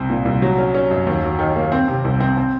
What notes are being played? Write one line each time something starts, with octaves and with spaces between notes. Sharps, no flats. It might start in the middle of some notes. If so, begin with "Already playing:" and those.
Already playing: C2 C4
A#2
C2
F#3
C#4
C#4
F#2
D#2
F#3
D#3
A#3
C4
C3
C2
C4
C4